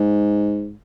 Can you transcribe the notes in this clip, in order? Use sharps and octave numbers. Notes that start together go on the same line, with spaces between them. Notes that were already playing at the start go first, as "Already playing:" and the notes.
Already playing: G#2